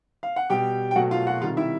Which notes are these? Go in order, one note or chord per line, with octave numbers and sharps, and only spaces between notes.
F5
F#5
B2 G3 G4 G5
G5
B2 F#3 A3 F#4 F#5
F4 F5
F#4 F#5
C3 D#3 G3 F4 F5
E4 E5